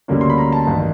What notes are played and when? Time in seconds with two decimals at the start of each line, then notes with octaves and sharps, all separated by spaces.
0.08 D2 D3 G3 A#3 C#4
0.21 C6
0.30 B5
0.38 A#5
0.52 A5
0.67 A1 G2 D#3